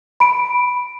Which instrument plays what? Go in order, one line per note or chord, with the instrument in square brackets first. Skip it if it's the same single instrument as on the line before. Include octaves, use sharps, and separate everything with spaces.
[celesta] B5 D7